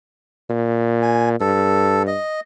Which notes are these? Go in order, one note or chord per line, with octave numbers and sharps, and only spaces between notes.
A#2
G#5
G2 A4
D#5